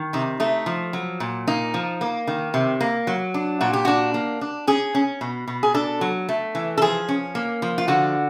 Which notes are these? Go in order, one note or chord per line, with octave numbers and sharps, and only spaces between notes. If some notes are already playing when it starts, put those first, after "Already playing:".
Already playing: D#3
C3 D#4
A3 D#4
F3
F#3
A#2
A#3 D#4
F3
A#3
D#3
C3
A#3
F#3
D4
A#2 F#4
G4
D4 F#4
A#3
D4
C#4 G#4
C#4
B2
B2
G#4
D4 A4
F#3
A3
E3
A4
F3 G#4
C#4
A#3
F3
F4
D3 F#4